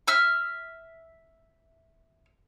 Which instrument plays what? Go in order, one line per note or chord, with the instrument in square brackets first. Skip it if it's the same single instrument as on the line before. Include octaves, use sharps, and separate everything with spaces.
[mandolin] E5 E6 F6